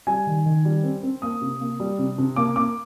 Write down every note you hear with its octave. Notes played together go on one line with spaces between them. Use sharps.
G3 G#5
D#3
D#3
G3
C4
C4
A#3 D#6
C3
A#3
G3
C3
C3
A#3 D6
A#3 D6